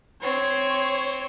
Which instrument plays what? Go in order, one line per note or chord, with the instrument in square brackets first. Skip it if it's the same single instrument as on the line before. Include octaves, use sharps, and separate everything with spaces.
[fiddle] C4 [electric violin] C#5